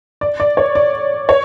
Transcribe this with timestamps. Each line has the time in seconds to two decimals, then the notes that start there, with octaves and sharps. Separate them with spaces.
0.21 D5
0.40 D5
0.57 C#5
0.75 D5
1.29 C#5